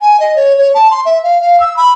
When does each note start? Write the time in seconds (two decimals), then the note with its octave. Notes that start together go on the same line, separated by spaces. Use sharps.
0.01 G#5
0.20 D#5
0.36 C#5
0.58 C#5
0.74 A5
0.91 C6
1.06 E5
1.24 F5
1.42 F5
1.60 E6
1.77 B5